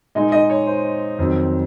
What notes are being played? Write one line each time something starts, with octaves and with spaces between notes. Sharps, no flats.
A#2 G#3 D#4 D#5
D#4 D#5
C#5
C5
F2 D#3 F#3 C4 D#4